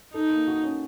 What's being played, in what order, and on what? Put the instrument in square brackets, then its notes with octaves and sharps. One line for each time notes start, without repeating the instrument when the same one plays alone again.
[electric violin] D#4 [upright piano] A4
[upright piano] A#3
F#4
C#4